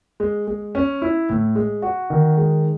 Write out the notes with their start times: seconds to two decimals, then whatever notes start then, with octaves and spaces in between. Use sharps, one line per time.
0.20 G#3
0.47 G#3
0.75 C#4
1.02 E4
1.29 A2
1.55 G#3
1.82 F#4
2.10 D#3
2.37 G#3